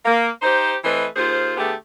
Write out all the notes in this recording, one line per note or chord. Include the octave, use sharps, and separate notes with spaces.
A#3
D#4 G4 C5
E3 A3 C4 B4 D#5
D#2 F4 G#4 C5
D3 A3 B3 G4 G#4